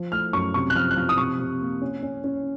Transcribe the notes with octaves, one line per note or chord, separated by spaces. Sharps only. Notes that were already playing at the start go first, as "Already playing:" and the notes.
Already playing: F3
A3 F6
F#2 C#6
C3 C#6
F#6
F3 F6
F#6
F3 F6
D#6
C3 C#6
C3
A#3
C#4
C#4
C#4